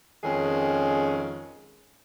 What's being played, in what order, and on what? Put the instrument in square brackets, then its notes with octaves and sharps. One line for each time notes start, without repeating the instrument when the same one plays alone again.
[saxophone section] F2 D#3 G#3 C#4 G#4